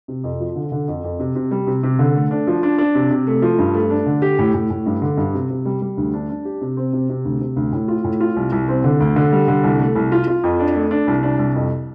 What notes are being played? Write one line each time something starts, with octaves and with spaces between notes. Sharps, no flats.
C3
F2
F3
D3
D3
F2
F2
C3
C3
G3
C3
C3
D3
A3
D4
F3
D4
D4
C3
C3
A3
F3
G2
A3
D4
D3
G4
A2
A2
A2
G2
D3
G2
C3
C3
G3
G3
D2
D4
D4
G4
C3
C4
C3
C3
D2
C3
D2
A2
F4
A2
F4
C2
C2
C4
D3
D2
D3
G3
D3
C2
A3
C2
F4
F4
F2
D4
A3
D4
C2
D4
C2
F2